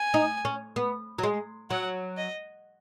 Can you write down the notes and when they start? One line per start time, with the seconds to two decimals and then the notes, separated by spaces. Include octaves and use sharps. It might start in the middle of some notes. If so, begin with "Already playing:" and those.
Already playing: G#5
0.14 D#4
0.45 C#4
0.76 B3
1.18 F#3
1.23 G#3
1.70 F#3 F#5
2.17 D#5